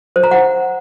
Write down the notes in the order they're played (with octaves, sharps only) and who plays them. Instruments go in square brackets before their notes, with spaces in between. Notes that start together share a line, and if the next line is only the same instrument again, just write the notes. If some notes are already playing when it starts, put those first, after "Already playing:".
[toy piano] C5
A#5
F#5